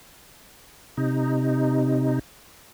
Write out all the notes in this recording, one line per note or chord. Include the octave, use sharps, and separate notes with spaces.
C3 D#4